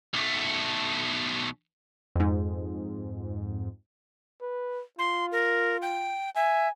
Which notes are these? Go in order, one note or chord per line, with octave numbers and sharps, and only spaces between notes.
B1 A3
F2 G#2
B4
F4 C6
A#4
G5
E5 G#5